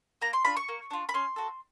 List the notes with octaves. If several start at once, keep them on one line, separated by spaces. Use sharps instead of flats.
A#3 A#5
C6
D4 F4 B5
C#6
A#3
D4 F4
B5
C#4 C6
F#4 A4